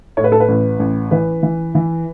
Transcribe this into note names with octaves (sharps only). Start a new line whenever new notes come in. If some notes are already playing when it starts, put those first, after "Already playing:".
A2 C#5
B4
A4
B4
A1
A1
E3 B4
E3
E3